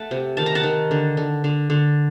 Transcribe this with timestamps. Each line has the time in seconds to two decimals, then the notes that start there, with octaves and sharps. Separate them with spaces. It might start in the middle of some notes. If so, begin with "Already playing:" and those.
Already playing: A3 F#5 A5
0.11 C3
0.37 D#3 A5
0.46 A#5
0.55 F#5 A5
0.63 D#3
0.91 D3
1.17 D3
1.44 D3
1.70 D3